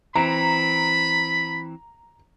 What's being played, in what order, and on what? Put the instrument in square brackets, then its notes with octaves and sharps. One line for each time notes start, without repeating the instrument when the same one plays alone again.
[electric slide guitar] E3 C4 [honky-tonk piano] A#5 [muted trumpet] B5